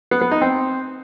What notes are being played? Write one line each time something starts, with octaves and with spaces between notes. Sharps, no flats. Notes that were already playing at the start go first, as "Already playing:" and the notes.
B3
B3
D#4
C4